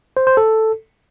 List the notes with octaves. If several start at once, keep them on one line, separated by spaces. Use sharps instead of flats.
C5
C5
A4